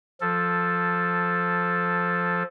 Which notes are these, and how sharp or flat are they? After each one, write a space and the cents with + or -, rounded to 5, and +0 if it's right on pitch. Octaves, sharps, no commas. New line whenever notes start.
F3 +5 A4 +0